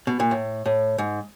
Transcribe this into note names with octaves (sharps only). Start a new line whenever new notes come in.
B2
A#2
A2
A2
G#2